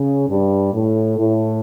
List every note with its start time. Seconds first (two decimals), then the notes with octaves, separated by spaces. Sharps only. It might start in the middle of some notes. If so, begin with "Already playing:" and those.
Already playing: C#3
0.29 G2
0.74 A2
1.19 A2